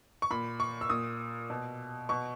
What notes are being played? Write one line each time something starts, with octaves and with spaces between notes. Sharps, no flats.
C#6
A#2 B5
C#6
E6
A#2 D#6
B2
B2 C#6